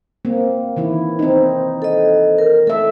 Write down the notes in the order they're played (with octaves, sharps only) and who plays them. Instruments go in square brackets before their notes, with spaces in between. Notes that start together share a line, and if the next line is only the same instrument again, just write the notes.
[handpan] A#3 C4
D#3 E3 E4
C4 D#4
[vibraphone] A4 D#5
A#4
[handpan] A3 E5 [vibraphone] A4